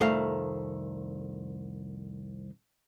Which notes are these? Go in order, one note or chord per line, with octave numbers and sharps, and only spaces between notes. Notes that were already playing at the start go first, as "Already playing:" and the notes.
C2 F2 D#3 A3 F5